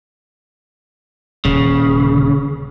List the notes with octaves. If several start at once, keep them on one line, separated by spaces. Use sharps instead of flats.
D#1 C#3